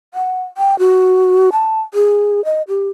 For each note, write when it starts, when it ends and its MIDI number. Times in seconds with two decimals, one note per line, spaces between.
0.14 0.43 78
0.58 0.78 79
0.79 1.50 66
1.52 1.81 81
1.94 2.44 68
2.45 2.62 75
2.68 2.89 67